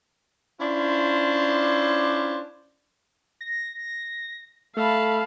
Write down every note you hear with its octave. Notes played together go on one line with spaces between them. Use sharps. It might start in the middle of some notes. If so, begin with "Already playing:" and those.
C#4 D4 E4 F4 C5
A#6
A3 F5 A5 B5